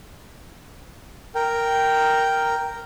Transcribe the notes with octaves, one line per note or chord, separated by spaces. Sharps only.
A#4 G5